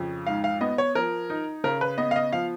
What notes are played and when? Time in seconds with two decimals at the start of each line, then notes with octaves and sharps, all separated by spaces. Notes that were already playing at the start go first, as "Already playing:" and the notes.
Already playing: F2 C#3
0.27 G#2 F5
0.44 F5
0.61 B3 D#5
0.78 C#5
0.95 F3 A#4
1.30 D#4
1.64 C#3 A#4
1.81 B4
1.98 B3 D#5
2.11 F5
2.16 D#5
2.32 F3 F5